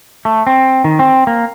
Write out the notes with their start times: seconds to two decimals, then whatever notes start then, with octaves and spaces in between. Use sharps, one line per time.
0.25 A3
0.47 C4
0.84 D#3
0.99 C4
1.27 A#3